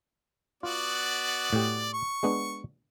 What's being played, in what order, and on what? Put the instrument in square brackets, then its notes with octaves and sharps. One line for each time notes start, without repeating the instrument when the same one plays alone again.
[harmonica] B3 F#4 D5 [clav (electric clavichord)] F4
[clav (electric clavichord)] A2 G4
[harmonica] C#6
[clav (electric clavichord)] G#3 B3 D4